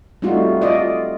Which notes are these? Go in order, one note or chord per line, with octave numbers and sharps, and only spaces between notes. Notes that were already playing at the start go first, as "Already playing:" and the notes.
G3 A3 C4 D#4 F4 F#4
F4 D5 D#5